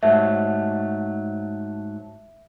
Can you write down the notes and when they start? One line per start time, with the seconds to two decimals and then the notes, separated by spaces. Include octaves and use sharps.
0.03 G#2 F#3 A3 E5